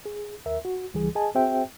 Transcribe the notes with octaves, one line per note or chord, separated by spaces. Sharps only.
G#4
D#2 A#4 E5
F#4
C#2 E3 G3 G#4
G#4 D#5 G#5 A5
C4 F#4 G#4 C5 E5 G5